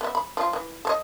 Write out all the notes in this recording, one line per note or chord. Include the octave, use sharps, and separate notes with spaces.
B3 E5
B5
F3 F4
E3
A4 C#5 D#5